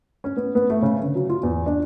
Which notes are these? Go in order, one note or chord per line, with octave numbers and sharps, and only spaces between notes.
C#4
B3
B3
A3
C#3
D3
F#3
F4
E2
D4